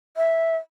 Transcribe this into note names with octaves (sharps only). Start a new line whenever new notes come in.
E5